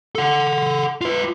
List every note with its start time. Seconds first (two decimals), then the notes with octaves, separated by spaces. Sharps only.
0.15 A4 F#5
1.01 F4 B4